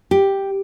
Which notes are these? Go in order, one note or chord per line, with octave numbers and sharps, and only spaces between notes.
G4